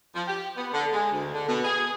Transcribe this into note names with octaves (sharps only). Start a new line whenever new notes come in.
F3
G4
B3
D3
G#3
D2
D3
B2
G#4